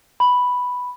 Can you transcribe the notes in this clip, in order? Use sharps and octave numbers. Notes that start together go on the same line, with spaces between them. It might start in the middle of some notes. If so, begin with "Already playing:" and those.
B5